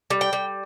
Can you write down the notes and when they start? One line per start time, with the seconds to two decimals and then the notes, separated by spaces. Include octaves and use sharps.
0.10 G3
0.21 G5
0.33 G3